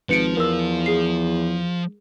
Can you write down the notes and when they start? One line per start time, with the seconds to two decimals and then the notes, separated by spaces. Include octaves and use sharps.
0.09 G#1 F3 B4 C#7 D7
0.37 E2 A#4 E6
0.86 G#4 C7